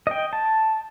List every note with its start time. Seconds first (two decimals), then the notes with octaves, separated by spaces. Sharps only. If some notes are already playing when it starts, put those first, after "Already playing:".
0.07 D#5 G5
0.33 A5